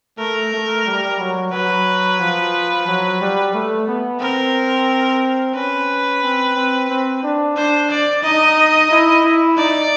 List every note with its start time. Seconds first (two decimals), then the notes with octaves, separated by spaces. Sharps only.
0.18 A3 A#4
0.53 A3
0.86 G3
1.19 F#3
1.52 F#3 B4
2.20 F3
2.87 F#3
3.21 G3
3.54 A3
3.88 B3
4.21 C4 A#4
5.54 C#4 B4
6.23 C4
6.55 C4
6.89 C4
7.23 D4
7.56 D4 C5
7.90 D5
8.23 D#4 D#5
8.91 E4
9.24 E4
9.57 D#4 D5